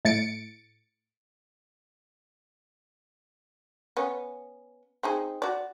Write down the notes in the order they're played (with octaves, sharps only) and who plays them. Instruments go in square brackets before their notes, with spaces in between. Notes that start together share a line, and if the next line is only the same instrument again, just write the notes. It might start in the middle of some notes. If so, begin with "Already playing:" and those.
[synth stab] A2 A6 C#7 D7
[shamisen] B3 C#4
C4 D#4 G#4
F#4 D5